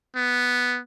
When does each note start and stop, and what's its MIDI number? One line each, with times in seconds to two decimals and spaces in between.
0.16 0.79 59